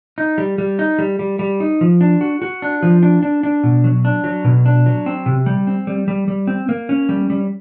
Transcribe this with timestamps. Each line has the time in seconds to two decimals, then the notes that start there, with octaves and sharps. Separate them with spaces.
0.18 D#4
0.38 G3
0.58 G3
0.79 D#4
0.99 G3
1.19 G3
1.39 G3
1.60 D#4
1.81 F3
2.01 D4
2.21 F#4
2.42 F#4
2.62 D4
2.83 F3
3.03 D4
3.23 D4
3.43 D4
3.63 B2
3.84 F#3
4.05 D4
4.24 F#3
4.44 B2
4.66 D4
4.86 F#3
5.06 C4
5.26 C3
5.46 G3
5.67 C4
5.87 G3
6.08 G3
6.28 G3
6.47 C4
6.69 A#3
6.89 C#4
7.09 G3
7.30 G3